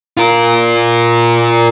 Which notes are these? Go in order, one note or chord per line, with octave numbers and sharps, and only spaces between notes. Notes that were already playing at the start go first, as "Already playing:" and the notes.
F4 A#4